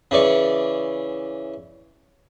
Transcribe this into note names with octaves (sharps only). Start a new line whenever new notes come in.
C#3 E3 D5 C#6